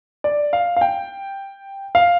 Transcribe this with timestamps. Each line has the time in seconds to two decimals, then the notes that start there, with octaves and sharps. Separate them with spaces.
0.24 D5
0.53 F5
0.76 F5
0.81 G5
1.95 F5